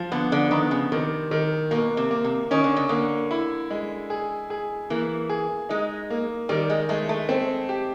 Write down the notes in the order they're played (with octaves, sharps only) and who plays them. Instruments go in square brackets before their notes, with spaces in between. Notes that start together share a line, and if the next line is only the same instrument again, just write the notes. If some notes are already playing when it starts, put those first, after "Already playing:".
Already playing: [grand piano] F3
[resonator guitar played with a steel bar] D3 [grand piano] B3
[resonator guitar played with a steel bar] D3
[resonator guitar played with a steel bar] D#3 [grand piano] B3
[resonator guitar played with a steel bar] C#3
[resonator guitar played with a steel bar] C3 [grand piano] D#3
[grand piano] D#3
[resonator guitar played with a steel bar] B2 [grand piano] A#3
[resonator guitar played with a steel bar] C3
[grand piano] A#3
[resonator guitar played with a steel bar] C3
[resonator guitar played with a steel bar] D#3 [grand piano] C#4
[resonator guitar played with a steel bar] D3
C#3
[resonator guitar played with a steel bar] D3 [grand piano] A#3
[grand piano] E4
G#3
G#4
G#4
[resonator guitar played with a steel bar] E3 [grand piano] A#3
[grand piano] G#4
[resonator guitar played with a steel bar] G#3 [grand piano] D#4
[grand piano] A#3
[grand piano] D#3 [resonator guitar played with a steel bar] G3
[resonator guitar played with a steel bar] G#3
[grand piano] G#3 [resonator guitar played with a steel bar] A3
[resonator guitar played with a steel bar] A3
[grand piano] C4
G4